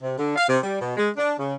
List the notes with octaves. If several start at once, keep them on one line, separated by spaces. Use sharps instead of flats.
C3
D3
F5
C3
G3
B2
G#3
D4
C#3